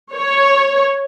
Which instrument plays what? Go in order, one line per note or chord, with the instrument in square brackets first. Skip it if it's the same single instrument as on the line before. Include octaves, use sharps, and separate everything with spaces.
[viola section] C#5